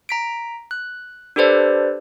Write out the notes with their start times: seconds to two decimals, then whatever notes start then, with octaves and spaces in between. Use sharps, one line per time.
0.09 A#5 B6 D7
0.71 F#6
1.36 D4 G4 A4 B4 C5 D5